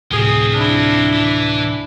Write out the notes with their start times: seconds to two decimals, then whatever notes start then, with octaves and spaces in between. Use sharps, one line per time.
0.11 D2 A2 C3 F3 C4 G#4
0.52 D4 E4
1.14 E3